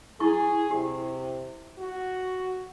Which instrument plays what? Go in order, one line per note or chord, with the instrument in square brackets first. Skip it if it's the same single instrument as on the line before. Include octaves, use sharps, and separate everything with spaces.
[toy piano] E4 C#6 [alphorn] G#4
[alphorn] C3 [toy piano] G4
[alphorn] F#4